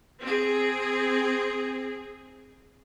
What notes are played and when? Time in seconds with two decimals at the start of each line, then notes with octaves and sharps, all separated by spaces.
0.20 C4 G#4